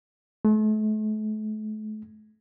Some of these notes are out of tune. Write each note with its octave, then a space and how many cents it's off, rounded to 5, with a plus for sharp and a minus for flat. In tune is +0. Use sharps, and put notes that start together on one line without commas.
A3 -40